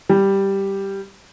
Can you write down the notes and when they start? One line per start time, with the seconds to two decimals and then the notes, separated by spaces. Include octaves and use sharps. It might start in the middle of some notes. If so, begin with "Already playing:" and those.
0.09 G3